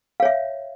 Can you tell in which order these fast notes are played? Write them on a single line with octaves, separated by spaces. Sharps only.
F5 C#5 E5